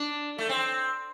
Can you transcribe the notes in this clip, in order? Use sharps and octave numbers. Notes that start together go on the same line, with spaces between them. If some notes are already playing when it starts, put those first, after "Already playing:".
Already playing: D4
A3
C4